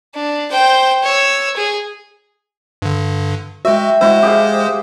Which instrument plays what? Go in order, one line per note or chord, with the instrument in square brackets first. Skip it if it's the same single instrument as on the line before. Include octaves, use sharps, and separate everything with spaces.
[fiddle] D4
C5 G5
C#5 E6
G#4
[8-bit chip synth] G2 D3
[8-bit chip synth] G#3 F#4 [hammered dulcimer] E5 G5
[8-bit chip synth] G#3 C5 [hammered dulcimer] E4 F#4
[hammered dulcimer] G4 G#4 F5